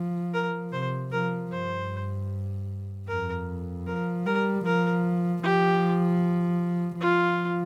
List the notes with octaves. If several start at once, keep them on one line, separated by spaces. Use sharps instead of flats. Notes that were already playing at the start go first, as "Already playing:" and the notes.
Already playing: F3
A#4
C3 C5
F3 A#4
G2 C5
F2 A#4
F3 A#4
G3 A#4
F3 A#4
F3 G4
F3 F4